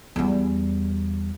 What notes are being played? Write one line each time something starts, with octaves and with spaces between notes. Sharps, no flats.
E2 G3